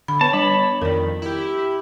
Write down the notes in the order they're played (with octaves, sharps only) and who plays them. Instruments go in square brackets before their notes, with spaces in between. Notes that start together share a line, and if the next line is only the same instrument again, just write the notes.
[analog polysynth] D3 [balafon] B5
[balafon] B3 B4 [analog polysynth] C#5 [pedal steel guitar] A5
[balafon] G3 D4 [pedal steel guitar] B5
[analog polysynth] F2 D#3 [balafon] A#4 D5
[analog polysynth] E4 G4